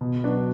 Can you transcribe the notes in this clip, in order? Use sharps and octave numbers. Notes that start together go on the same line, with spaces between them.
B2
F#3 D4 F#4 B4